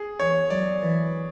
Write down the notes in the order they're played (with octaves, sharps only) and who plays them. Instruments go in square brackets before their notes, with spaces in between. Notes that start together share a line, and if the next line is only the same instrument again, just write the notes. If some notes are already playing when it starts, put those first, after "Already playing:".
Already playing: [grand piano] G#4
[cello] E3 [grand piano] C#5
[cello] F#3 [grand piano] D5
[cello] E3